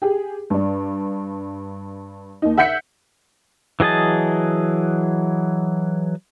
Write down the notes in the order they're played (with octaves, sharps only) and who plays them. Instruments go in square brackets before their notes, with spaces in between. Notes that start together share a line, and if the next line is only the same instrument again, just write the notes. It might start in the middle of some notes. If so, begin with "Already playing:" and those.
[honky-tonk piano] G4 G#4
G2 D4
D#2 D#4
E5 F#5 G6 B6 C#7
[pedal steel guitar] E3 F#3 G#4 D#5 A5